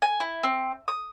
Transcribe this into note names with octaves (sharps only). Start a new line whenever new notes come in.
G#5
E4
C4
D#6